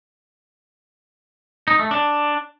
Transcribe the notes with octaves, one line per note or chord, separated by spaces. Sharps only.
D#4
A3
D4